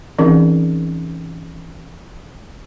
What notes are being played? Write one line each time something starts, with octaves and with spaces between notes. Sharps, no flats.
E3 C4 C#4 D#4 G#4 A#4